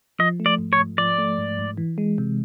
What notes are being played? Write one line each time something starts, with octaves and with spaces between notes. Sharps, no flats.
F3 D#5
A3
D5
G#2
C#5
G#2
F3 D5
A3
G#2
G#2
E3
G#3
C3